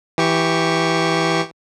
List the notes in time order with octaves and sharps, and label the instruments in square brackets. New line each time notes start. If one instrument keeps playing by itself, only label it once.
[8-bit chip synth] E3 G4 C#6